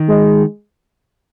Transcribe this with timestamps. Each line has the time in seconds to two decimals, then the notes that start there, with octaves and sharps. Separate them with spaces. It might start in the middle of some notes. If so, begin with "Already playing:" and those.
Already playing: D#3
0.08 G#3